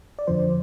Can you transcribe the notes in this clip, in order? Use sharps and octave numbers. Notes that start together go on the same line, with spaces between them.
D5
F2 D3 F3 C5